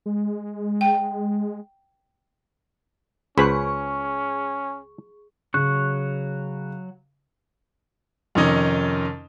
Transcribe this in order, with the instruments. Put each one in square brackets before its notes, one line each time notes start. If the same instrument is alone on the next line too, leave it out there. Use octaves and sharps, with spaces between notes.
[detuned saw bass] G#3
[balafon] G5
[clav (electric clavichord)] C#2 [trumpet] C#4 [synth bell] G#4 C#6 [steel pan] B4 C5 B5
[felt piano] C#3 [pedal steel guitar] F#3 C#6 F#6
[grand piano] F2 C3 D#3 C#4 D#4